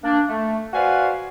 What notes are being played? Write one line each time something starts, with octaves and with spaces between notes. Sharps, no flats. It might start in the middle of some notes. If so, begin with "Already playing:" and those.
A#3 D4
A3
F#4 B4 C5 D5 F5 G#5